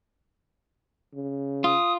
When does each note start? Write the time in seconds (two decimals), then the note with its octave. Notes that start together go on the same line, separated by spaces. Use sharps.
1.14 C#3
1.64 F4 D#6